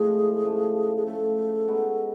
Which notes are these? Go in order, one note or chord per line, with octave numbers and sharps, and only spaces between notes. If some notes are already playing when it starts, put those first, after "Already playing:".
Already playing: A2 F3 G#3 C4 G#4
C#3 F3 A3
G#4
C#3 F3 A3 A4
G#3 B3 D#4 F#4